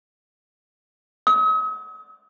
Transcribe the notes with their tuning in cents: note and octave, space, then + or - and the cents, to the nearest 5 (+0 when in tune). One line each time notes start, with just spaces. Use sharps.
D#6 +45